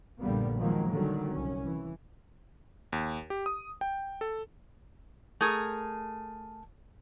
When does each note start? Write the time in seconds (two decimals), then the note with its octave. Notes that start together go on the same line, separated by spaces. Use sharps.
0.19 A#1 G2 D3 G3 A#3 B3
0.57 D#3 F3 F#3 G#3 A#3
0.90 D3 D#3 F#3 G3
1.33 C2 C#4
1.64 E3
2.93 D#2
3.30 G4
3.46 D#6
3.81 G5
4.21 A4
5.41 A3 G#4 A#4